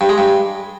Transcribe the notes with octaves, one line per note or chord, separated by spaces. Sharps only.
G2
G#3
G2